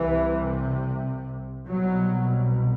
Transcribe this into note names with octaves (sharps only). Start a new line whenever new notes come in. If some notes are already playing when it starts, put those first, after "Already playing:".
Already playing: C2 C3 E3
C2 B2 F#3